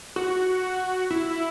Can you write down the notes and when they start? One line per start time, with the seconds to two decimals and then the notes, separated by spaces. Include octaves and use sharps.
0.16 F#4
1.10 E4